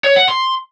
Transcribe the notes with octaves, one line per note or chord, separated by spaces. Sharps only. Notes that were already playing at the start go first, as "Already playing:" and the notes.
C#5
F#5
C6